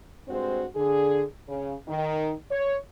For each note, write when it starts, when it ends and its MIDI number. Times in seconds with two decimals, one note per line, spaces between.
0.27 0.64 43
0.27 0.64 56
0.27 0.64 60
0.27 0.64 66
0.27 0.64 72
0.74 1.23 50
0.74 1.23 68
1.47 1.73 49
1.87 2.31 51
2.50 2.76 73